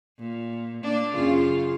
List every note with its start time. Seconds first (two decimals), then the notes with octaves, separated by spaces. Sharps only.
0.19 A#2
0.83 A#3 D4
1.15 F#2 C#3 F4